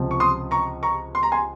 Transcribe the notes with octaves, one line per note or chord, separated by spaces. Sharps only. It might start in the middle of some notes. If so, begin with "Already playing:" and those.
Already playing: C#2 C3 F3
C#6
C6 D#6
A#5 C#6
A#5 C#6
C6
A#5
G#5 C6